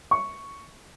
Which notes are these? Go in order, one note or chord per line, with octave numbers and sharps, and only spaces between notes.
C#6